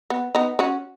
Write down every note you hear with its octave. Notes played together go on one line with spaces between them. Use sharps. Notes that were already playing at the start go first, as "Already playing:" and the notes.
B3
B3 D#4
C#4 F#4